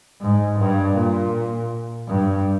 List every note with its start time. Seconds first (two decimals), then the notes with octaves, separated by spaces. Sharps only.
0.21 G#2
0.58 G2
0.96 A#2
2.08 G2